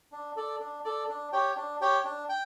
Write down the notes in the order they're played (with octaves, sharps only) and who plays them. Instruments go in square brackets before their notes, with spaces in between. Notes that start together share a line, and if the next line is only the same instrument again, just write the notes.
[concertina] D4
A4 D5
D4
A4 D5
D4
G4 C#5 G5
D4
G4 C#5 G5
D4
G5